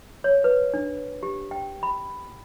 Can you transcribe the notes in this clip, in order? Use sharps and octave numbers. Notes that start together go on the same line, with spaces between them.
C#5
B4
D4
G4
G5
B5